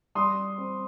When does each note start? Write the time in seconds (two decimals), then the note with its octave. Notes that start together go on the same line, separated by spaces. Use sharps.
0.15 G3 C6 D#6
0.58 C4